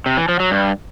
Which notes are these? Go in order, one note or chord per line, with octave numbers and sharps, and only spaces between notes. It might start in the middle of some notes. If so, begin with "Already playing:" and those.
C3
E3
F3
F#3
G2